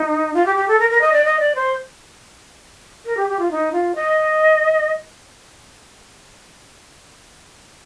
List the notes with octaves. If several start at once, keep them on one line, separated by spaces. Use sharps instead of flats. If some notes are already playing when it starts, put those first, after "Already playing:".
Already playing: D#4
F4
G4
G4
A4
A#4
A#4
D#5
D5
D#5
D5
C5
A#4
G4
G4
F4
D#4
F4
D#5